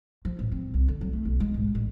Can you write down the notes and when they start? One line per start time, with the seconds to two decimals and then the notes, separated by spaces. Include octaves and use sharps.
0.25 F3
0.39 A1
0.52 C4
0.74 C2
0.88 D3
1.01 F#3
1.13 A3
1.25 B1
1.40 G#3
1.54 G#2
1.75 A1